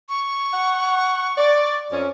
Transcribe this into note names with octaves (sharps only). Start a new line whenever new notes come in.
C#6
F#5
D5
F2 C#4